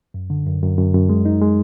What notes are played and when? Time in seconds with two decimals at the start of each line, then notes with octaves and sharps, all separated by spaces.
0.14 F#2
0.30 D3
0.47 F#2
0.63 F#2
0.78 F#2
0.94 F#2
1.09 G#3
1.25 D#4
1.41 G#3